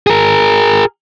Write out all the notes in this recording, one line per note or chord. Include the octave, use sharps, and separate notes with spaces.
G#4 A#4